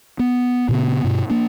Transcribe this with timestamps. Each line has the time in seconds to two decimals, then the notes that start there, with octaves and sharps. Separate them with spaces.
0.19 B3
0.69 A#2 C#3 B3
1.04 G2 B2
1.30 A#3 D4